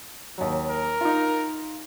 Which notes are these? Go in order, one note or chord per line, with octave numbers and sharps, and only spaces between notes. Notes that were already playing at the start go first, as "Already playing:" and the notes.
D#2 F#3
A#4
D#4 F4